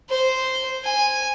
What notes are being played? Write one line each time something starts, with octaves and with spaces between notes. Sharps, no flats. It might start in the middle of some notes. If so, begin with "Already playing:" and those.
C5
G#5